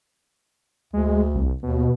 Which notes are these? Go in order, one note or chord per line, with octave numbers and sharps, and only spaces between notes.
D2 G#3
C2
D#2 B2